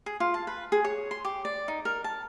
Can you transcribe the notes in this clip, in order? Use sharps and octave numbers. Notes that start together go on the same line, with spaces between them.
G#4
F4
A5
B4
G#4
C#5
C6
G4
D5
D#4
A#4
A5